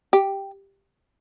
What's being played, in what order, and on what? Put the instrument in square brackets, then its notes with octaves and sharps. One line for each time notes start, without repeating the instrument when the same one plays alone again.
[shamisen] G4